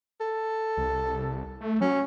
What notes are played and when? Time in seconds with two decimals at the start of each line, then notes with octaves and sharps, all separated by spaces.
0.21 A4
0.77 C2
1.61 A3
1.81 F#3 C#4